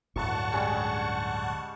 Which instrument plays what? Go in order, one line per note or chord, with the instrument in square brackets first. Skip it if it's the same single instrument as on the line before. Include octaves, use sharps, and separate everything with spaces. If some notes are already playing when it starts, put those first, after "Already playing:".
[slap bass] D1 G2 [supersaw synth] F#5 A5 C#6
[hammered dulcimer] G3 G#3 C#4